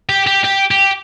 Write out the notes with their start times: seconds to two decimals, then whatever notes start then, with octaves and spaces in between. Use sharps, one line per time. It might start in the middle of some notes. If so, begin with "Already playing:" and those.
0.09 G4
0.27 G4
0.44 G4
0.71 G4